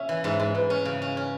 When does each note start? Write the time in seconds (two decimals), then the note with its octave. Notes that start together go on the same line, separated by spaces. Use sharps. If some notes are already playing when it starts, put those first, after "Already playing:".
Already playing: C#4 C#5 E5
0.09 E3
0.23 G#2 E5
0.40 G#2
0.55 G#2 B4
0.70 C#4
0.85 C#3
1.02 C#4
1.17 C#4